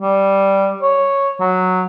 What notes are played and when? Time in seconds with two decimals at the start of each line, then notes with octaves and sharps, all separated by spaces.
0.01 G3
0.82 C#5
1.40 F#3